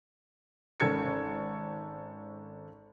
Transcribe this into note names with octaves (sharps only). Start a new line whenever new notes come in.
G#1 C#4 A4 G#6 C#7